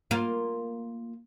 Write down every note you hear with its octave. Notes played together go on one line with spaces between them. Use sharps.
A#3 F4